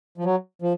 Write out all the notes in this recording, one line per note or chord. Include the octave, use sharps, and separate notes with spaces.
F3
F#3
F3